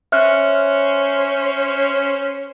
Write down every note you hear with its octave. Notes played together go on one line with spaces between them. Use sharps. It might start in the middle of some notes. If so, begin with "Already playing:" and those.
C#4 C5 C#5 E5 F6 F#6